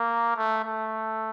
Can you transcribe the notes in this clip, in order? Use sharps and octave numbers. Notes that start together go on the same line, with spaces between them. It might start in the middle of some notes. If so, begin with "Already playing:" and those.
Already playing: A#3
A3
A3